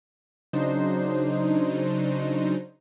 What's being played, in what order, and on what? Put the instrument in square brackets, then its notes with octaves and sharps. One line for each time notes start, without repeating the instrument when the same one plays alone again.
[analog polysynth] C#3 F#3 D4 D#4 C5